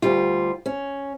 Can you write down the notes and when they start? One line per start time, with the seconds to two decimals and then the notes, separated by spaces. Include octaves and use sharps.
0.02 D2 G3 F4
0.66 C#4